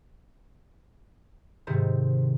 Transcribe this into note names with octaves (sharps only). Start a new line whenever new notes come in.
G#2 C3 D#3